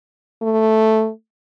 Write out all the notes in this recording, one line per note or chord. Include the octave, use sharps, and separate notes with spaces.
A3